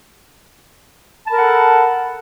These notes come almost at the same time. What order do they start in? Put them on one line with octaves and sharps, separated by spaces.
A5 B5 A#4 F#5 A4